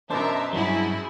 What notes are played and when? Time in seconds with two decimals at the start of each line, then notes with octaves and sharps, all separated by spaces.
0.10 F#2 B2 D4 A#4 C5 E5 A5
0.53 G2 F#3 E4 F#4 G#4